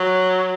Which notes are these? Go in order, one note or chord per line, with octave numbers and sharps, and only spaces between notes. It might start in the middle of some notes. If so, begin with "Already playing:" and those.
Already playing: F#3